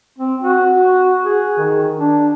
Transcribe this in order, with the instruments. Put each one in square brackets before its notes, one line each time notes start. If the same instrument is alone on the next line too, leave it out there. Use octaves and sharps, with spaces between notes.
[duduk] C4
F#4
G#4
D#3
D4